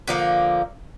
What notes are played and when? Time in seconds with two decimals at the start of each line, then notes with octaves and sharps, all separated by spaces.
0.08 D3 F3 A#3